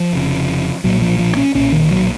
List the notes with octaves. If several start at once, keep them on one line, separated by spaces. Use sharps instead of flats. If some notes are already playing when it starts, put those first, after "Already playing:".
Already playing: F3
F1 F2 C#3
B1 A#2 F#3
F3
F3
C#4
B1 A#2 C#4
D#3
F#3